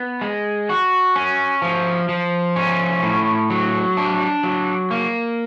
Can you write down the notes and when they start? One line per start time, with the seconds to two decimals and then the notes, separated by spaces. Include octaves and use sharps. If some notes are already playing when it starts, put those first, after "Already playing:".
Already playing: B3
0.21 G#3
0.69 F#4
1.16 C#4
1.62 F3
2.09 F3
2.56 C#4
3.02 A2
3.50 F#3
3.97 D4
4.43 F#3
4.91 A#3